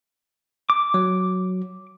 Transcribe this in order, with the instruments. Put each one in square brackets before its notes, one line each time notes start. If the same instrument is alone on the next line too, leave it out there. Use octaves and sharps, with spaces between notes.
[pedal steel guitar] D6
[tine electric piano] F#3